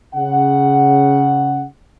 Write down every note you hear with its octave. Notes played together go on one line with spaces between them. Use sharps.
C#3 F#5